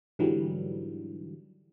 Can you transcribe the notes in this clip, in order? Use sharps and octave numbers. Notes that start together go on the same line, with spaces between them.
G#2 D3 E3 F#3 G3